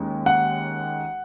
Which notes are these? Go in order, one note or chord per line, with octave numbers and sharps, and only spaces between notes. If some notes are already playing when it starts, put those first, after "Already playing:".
Already playing: D#2 G#3 C#4
F#5